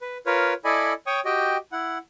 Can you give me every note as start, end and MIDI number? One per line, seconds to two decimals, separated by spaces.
0.01 0.17 71
0.26 0.53 65
0.26 0.53 70
0.26 0.53 71
0.26 0.53 73
0.65 0.93 64
0.65 0.93 69
0.65 0.93 74
0.65 0.93 75
0.65 0.93 80
0.65 0.93 83
1.07 1.20 73
1.07 1.20 79
1.07 1.20 85
1.07 1.20 87
1.25 1.57 66
1.25 1.57 67
1.25 1.57 75
1.25 1.57 79
1.72 1.98 64
1.72 1.98 78